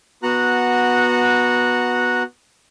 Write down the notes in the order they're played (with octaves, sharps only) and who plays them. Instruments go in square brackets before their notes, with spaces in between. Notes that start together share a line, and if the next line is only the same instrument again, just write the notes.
[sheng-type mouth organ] B3 F#4 F#5 A#5 F#6